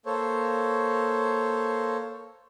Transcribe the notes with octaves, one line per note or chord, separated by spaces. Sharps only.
A#3 A4 C5 C#5